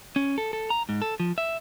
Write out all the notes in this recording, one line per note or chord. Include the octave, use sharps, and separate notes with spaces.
C#4
A4
A4
A#5
G#2
A4
F3
E5